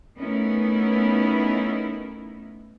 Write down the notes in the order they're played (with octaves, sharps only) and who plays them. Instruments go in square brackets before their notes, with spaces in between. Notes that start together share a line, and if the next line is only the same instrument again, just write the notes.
[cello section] A3 B3 C#4 D#4 E4 A#4